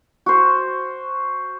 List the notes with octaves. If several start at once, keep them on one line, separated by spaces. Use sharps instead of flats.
F#4 C5